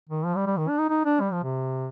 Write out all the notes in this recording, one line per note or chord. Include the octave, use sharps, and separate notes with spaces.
D#3
F3
G3
G3
D#3
D4
D#4
D#4
D4
G3
F3
C3